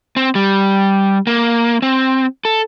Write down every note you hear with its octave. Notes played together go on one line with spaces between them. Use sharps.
C4
G3
A#3
C4
A4